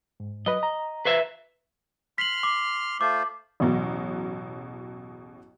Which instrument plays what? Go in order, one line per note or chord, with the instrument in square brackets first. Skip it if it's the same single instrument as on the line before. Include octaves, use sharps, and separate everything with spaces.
[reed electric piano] G#2
[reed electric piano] F#3 B4 [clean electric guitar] D#5
[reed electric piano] A#5
[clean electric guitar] B4 C5 E5
[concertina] C6 F6 [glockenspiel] B6 F#7
[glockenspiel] D6
[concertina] A3 F4 C5 [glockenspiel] D6
[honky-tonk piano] A1 E2 B2 F#3